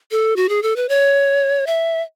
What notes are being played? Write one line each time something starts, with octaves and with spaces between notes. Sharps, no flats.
A4
F#4
G#4
A4
B4
C#5
E5